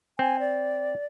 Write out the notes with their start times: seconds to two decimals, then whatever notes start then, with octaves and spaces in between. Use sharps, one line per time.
0.19 C4 G#5
0.40 D5